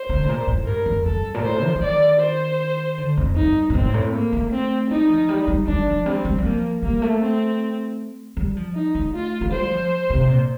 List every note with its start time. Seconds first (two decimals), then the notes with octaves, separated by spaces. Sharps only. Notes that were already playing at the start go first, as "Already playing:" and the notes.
Already playing: C5
0.09 D3
0.24 A2
0.29 A#2
0.47 A2
0.66 G2 A#4
0.86 F2
1.05 G2 A4
1.34 A#2
1.43 A2 C5
1.63 F3
1.76 F3
1.82 D#3 D5
2.21 C5
2.98 D3
3.17 F2
3.36 G2 D#4
3.70 A#2
3.75 A2 C4
3.90 G2
3.94 A2
4.14 A#3
4.32 A3
4.51 C4
4.90 G3 D#4
5.09 F3
5.29 G3
5.48 G3
5.67 G3 D4
5.86 F3
6.06 G3 C4
6.25 G3
6.38 G3
6.45 F3 A#3
6.82 G3 A#3
7.02 A3
7.21 C4
8.37 G3
8.57 F3
8.75 D#4
8.95 A3
9.14 F4
9.41 A3
9.52 G3 C5
9.71 F3
10.10 C3
10.29 A#2